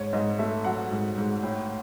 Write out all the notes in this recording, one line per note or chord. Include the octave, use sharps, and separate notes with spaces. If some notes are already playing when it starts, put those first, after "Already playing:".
Already playing: G#2 C#5
G#2 D#5
A3 E5
F#3 F#5
G#2
G#2
A2